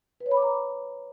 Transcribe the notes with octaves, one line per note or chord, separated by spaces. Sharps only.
B4
C#5
B5
D6
A#5